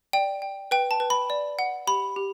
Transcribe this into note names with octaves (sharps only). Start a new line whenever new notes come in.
D5 G5
G5
B4 G5
A5
B4
B5
D5
F#5
G4 B5
G4